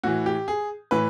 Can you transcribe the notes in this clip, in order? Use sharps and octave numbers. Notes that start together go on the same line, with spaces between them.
A2 E3 F#4
G4
G#4
A2 E3 B4